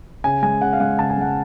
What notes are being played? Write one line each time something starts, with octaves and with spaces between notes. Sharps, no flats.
C#3 G#5
G#3 G#5
C#3 F#5
F5
G#3 F#5
C#3 A5
G#5
G#3 F#5